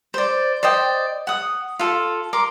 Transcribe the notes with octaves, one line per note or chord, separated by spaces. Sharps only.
C5 D5
C5 D5 D#5 G5
F#5 D#6
F4 A4
A#4 C6 D6